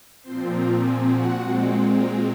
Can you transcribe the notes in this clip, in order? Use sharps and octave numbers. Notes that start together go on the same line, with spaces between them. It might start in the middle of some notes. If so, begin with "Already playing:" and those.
A#2 F3 C4 C5 C6
A#4 A#5
G#4 G#5
F#4 F#5
A#2 G#3 C4
A#4 A#5